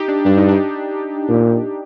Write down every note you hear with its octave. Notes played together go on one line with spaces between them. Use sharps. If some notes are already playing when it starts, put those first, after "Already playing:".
Already playing: D#4 G4
D4
G2 D4
D#4
D4
A#2